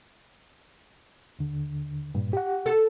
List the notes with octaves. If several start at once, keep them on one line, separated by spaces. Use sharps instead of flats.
D#2 D3
G2 A#2
G4 F#5
A4